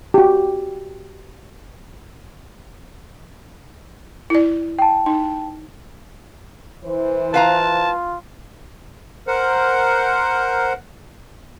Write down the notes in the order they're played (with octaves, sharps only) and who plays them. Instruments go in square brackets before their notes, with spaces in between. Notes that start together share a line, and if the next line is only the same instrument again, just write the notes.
[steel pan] F#4 G4
[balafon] E4 D5
[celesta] G5 A5
[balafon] D#4
[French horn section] E3 C5
[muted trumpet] F4 [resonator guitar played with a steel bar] B4 F5 A#5 [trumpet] A5
[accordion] A#4 C5 F#5